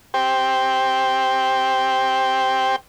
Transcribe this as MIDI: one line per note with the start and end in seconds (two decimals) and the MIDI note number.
0.14 2.76 67
0.14 2.76 72
0.14 2.76 79